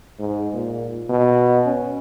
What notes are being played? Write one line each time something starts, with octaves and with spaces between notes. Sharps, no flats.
G#2
A#2
B2
C#4